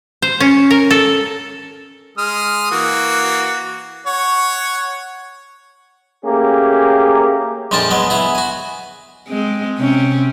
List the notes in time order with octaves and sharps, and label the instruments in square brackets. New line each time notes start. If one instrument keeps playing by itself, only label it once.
[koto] C5
C#4
A#4
A4
[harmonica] G#3 D#6 F6
E3 A#3 F#4
C#5 F#5
[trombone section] A3 A#3 C#4 G4 G#4
[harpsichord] A#1 F2 F3 D4 G#5 A5
F#3 G#3 B3
B3 E4 G#4
F#4 G#5
[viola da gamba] G#3 C4
C3 C4 C#4